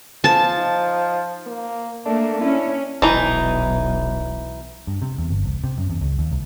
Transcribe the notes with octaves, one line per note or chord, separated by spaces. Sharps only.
F3 A5
D#4
A#3
A3 A#3 D4
C#4 E4
D#1 B1 E3 D#4
G2
C3
E2
G1
C2
C3
F#2
E2
C#2
D#2
C2